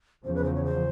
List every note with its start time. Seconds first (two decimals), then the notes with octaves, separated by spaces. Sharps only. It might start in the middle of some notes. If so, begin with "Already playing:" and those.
0.25 E2 C#3 F3 C5
0.35 B4
0.44 C5
0.55 C#5
0.64 C5